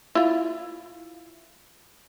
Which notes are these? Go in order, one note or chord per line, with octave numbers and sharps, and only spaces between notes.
E4 F4